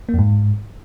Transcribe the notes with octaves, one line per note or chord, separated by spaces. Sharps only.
A#3
F2
G#2